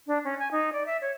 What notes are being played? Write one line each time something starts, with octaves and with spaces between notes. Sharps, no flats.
D4
C#4
G#5
D#4
D5
E5
C#5